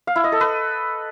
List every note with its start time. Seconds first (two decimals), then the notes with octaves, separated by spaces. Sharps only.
0.07 F5
0.16 E4
0.24 D#5
0.32 A4
0.41 B4